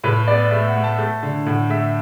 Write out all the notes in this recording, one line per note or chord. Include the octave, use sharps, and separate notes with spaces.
A2 B4
B3 D5
A3 E5
F#5
A3
A5
A3
D3
A2 F#5
A3 E5